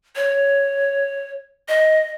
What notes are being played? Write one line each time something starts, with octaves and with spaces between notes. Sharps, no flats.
C#5
D#5